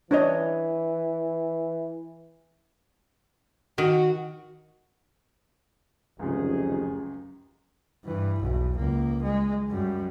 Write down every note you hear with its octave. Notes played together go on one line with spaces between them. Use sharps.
E3 D4 C#5 D#5
D#3 F#4
F1 C#2 F#2 D#3 G#4
G2 E3
B1 E2
C#2 A#3
G#3
F#2 G3